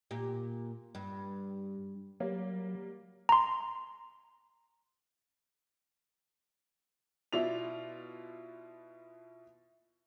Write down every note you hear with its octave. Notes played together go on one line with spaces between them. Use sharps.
A#2 G4
G2
F#3 G3 A#3
A#5 C6
B2 E4 F4 D5 F7